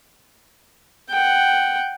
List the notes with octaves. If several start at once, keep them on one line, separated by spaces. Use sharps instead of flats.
F#5 G5